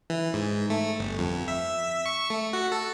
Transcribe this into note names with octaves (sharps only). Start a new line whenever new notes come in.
E3
G#2
A3
G1
F2
E5
C#6
A3
F#4
A4